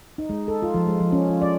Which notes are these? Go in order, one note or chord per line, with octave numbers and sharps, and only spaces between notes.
D#4
G#3
A4
F4
F3
G#3
F3
C#4
F4
D5